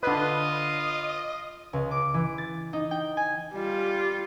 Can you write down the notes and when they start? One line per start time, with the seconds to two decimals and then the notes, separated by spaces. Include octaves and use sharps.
0.03 D3 F4 B4 D#5
1.73 C#2
1.91 D6
2.14 E3
2.38 A6
2.73 D#4
2.91 G5
3.17 G#5
3.53 G3 F4